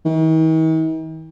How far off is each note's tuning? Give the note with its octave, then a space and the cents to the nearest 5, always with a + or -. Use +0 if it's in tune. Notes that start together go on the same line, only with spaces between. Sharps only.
D#3 +45